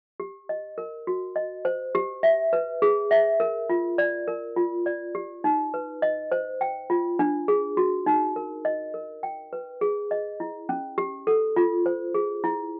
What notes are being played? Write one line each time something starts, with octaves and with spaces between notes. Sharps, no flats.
G4
D#5
A#4
F#4
D#5
C5
G4
E5
B4
G#4
E5
A#4
F4
D5
A#4
F4
D5
G4
D#4
B4
D#5
C5
G5
F4
D4
G#4
F#4
D#4
A#4
D#5
A#4
G5
B4
G#4
D#5
E4
C#4
G4
A4
F4
C5
G#4
E4